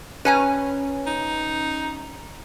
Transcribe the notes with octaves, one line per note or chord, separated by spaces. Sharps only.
C#4 B4 G#5 A#5
D#4